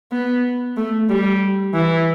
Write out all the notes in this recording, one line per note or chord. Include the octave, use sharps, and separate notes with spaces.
B3
A3
G3
E3